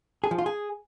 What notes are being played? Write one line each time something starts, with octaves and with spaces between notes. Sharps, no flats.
G#4
F3
F4
G#4